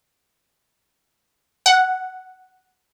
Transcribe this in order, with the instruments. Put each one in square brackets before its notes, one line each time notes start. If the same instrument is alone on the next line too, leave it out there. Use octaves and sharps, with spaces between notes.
[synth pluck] F#5